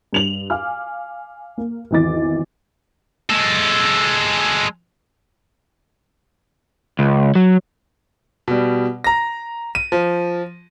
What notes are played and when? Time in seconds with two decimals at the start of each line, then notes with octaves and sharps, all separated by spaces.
0.13 G2 F7 F#7
0.50 F5 G#5 D6 F6
1.58 A#3
1.91 G#1 E2 E3 D#5 D6 A6
3.30 G#3 A4
6.99 C#2
7.35 F#3
8.48 B2 G3
9.04 A#5 A#6
9.75 D#7
9.92 F3